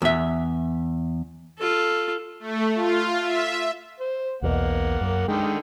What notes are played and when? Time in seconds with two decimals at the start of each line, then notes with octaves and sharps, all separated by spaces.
0.02 E2 E5
1.59 F4 A4
2.40 A3
2.75 F4
3.22 E5
4.00 C5
4.42 B1 E2 B2 A#3 F#5
5.01 F#2
5.28 D3 D#3 G#3 G5